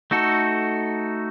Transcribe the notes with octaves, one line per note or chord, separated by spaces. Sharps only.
A3 D#4 F#4 A4